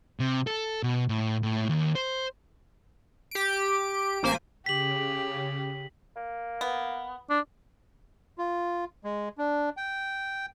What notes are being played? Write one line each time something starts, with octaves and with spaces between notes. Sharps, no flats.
C3
A4
B2
A2
A2
D#2
C5
G4 D7
A1 A#3 C5 G#5 B6 D7
C#3 G4 B6 F#7
A#3
B3
D4
F4
G#3
D4
G5